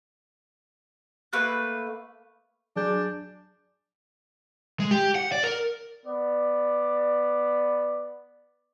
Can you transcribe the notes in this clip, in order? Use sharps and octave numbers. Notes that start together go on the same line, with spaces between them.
A3 A#3 B4 F#6
F#3 D4 G#4 G6
G#3
G4
F#5
D5
A#4
B3 D5